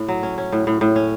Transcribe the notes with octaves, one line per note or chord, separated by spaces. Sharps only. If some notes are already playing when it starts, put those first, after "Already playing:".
Already playing: A2
F#3
C#4
C#4
A2
A2
A2
C#4